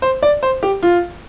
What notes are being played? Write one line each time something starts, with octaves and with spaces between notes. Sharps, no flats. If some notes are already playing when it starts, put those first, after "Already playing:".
C5
D5
C5
G4
F4